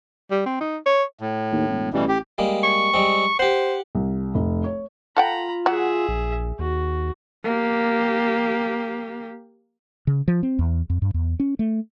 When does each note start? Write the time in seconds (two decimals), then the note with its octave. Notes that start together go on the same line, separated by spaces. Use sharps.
0.31 G3
0.46 C4
0.61 D#4
0.86 C#5
1.19 A2
1.52 D#2
1.69 E1
1.93 A1 B2 E3 G3
2.08 G4
2.38 G3 G#3 A#3
2.63 C#6
2.94 G3 G#3 C4
3.39 G4 C5 F#5
3.95 C2
4.35 F1
4.64 C#5
5.17 F4 A4 F#5 G5 A#5 B5
5.66 F#3 G#4 E5 F#5
6.09 A#1
6.59 D#2 F#4
7.44 A#3 G4
10.07 C#3
10.28 F3
10.43 C4
10.59 E2
10.90 F2
11.02 G2
11.14 E2
11.40 C#4
11.59 A3